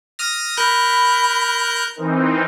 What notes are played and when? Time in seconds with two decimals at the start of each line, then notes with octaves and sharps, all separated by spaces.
0.19 D#6 F6 A#6
0.57 A#4 B5 F#6 G6
1.96 E3 C4 D#4 A#4